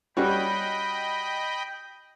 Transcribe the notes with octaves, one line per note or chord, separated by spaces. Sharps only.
G3 C#4 F#4 D#5 G5 B5